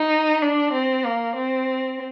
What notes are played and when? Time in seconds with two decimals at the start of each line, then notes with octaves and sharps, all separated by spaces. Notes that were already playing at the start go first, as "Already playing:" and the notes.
Already playing: D#4
0.42 D4
0.73 C4
1.05 A#3
1.36 C4